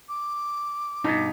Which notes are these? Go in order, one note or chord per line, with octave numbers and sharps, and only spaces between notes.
D6
G2 B2 D#4